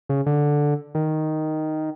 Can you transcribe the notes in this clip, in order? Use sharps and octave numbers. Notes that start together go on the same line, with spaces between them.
C#3
D3
D#3